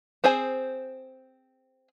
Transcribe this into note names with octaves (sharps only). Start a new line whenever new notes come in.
C4 G#4 C5 G#5